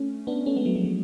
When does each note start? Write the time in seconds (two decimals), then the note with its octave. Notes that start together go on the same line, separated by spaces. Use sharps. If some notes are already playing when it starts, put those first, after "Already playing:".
Already playing: A3 C#4
0.27 B3 D4
0.46 A3 C#4
0.57 G#3 B3
0.65 F#3 A3
0.75 F3 G#3
0.84 F#3